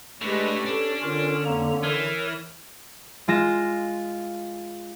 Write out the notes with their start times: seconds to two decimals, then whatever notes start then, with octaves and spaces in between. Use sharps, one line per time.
0.21 A2 G#3 A3 D4 G4 B4
0.66 C#4 D4 A4
1.02 D3 F4 A#4
1.45 F2 A#3 A#5
1.83 E3 A#4 C#5
3.28 G#3 F4 A#6 E7